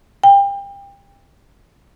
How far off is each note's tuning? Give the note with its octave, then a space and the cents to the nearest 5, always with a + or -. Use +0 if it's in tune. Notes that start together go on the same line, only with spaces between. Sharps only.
G5 +30